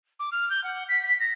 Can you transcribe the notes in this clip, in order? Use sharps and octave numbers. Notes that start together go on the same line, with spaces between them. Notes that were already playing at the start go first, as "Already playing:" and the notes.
D6
F6
G6
F#5
B6
B6
A#6